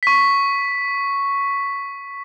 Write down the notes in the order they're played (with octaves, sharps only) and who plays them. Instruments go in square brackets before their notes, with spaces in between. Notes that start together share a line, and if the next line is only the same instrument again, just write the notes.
[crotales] C#6 B6